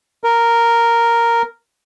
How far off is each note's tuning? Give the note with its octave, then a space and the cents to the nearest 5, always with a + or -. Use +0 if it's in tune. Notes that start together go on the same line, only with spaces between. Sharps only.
A#4 -5